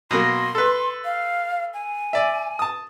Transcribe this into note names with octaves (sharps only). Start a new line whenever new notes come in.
B2 F#3 A#3 C6
A4 B4
F5
G#5
D5 E5
A5 D#6